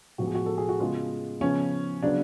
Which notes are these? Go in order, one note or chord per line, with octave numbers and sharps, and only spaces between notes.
A2 F3 G#3 B3 F#4
G#4
F#4
A4
G#4
F#4
C#3 G#3 B3 F4
C#3 F3 B3 C#4
C#3 F#3 B3 D4